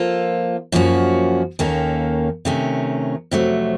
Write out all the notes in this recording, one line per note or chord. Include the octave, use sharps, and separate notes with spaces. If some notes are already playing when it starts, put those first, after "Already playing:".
Already playing: F3 A#3 F4 A4
F#2 F3 A#3 C#4 F#4
D#2 D#3 A#3 C#4 A4
C3 D#3 A3 C#4
F2 C3 F#3 A3